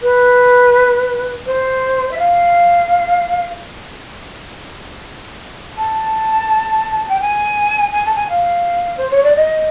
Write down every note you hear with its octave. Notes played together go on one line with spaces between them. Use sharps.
B4
C5
E5
F5
A5
G5
G#5
G#5
A5
G#5
F5
C5
C#5
D5
D#5